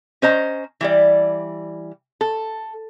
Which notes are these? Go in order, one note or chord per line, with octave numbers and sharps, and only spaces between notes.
C#4 C5 D#5 A#5
E3 G3 D5
A4